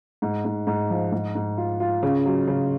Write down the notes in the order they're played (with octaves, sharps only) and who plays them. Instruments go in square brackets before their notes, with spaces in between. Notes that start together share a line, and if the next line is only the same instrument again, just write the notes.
[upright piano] G#2
G#2
G#2
F3
G#2
G#2
F4
F4
C#3
F#3
C#3